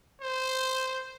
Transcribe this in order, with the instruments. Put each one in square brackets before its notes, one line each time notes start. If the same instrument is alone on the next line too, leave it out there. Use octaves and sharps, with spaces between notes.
[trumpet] C5